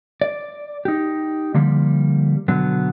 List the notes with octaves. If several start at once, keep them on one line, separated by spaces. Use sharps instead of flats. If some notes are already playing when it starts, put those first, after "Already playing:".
D5
D#4 G4
D3 F3 G3 A#3
B2 D3 F#3 B3